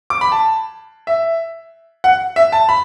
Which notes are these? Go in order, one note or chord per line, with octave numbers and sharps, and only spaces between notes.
D6
B5
A5
E5
F#5
E5
A5
B5